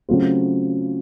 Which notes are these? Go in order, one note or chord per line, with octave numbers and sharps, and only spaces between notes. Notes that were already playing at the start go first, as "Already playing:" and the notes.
C#3 F#3 A3 C4 F4